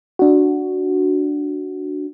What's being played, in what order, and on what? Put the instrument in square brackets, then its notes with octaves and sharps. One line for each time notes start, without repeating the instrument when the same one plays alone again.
[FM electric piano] D4 F#4